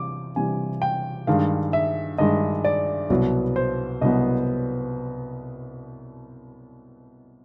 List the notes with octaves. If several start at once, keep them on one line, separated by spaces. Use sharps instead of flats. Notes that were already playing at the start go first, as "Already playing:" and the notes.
Already playing: C3 E3 G3 D6
C3 E3 G3 G#5
G5
G2 D#3 G#3 F5
E5
G2 D#3 G#3 D#5
D5
C2 B2 F#3 B3
C5
C2 B2 F#3 B3 D#5